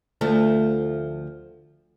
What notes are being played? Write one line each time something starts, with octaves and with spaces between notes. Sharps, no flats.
D2 F3 A3